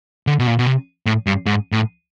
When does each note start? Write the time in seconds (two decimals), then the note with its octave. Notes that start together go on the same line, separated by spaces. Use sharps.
0.27 D3
0.39 B2
0.47 A#2
0.59 B2
0.67 C3
1.06 A2
1.27 G2
1.46 G#2
1.72 A2